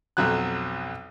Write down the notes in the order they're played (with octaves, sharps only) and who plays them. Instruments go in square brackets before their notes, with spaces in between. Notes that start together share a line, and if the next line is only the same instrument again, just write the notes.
[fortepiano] B1 F2 F#3 F#6